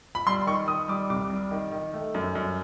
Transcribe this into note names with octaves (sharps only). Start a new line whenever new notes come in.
B5
G3 C6
D#3 C#6
D#3 D#6
G3 D6
C2 D6
G3
D#3
D#3
A3
F#2
F#2